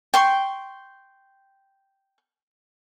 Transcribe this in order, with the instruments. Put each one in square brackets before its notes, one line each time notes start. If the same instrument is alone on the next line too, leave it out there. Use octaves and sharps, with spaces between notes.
[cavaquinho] G5 C6 C#6